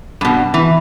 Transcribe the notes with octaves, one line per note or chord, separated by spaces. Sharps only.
G2 B2
E3